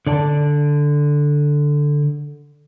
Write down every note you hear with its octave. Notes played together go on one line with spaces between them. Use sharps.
D3 D5 A5